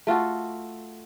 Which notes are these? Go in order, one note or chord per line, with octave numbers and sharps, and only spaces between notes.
A3 F4 F#4 A4